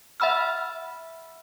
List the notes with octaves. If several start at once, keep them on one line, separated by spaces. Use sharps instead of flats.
E5 F#5 B5 E6 F6